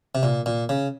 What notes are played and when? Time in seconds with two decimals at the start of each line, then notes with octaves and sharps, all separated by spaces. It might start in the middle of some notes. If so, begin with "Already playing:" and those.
0.15 C3
0.23 A#2
0.46 A#2
0.69 C#3